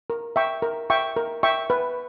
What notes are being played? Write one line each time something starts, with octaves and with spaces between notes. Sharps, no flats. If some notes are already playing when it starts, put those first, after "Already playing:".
A#4
E5 G5 C#6
A#4
E5 G5 C#6
A#4
E5 G5 C#6
B4